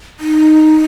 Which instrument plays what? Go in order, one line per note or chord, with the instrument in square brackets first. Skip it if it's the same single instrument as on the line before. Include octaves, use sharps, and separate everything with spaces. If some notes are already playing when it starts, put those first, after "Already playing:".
[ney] D#4